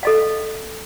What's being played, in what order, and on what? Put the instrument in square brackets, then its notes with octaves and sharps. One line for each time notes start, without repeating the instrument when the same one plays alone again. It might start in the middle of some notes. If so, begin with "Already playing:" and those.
[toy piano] A4 D#5 F5